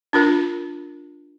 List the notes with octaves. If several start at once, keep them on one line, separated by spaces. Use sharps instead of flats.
D4 F4 A#4